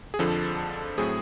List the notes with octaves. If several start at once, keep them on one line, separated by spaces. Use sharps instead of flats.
G#4
F2 D3 F3 A4
A2 F#3 A3 C4 G#4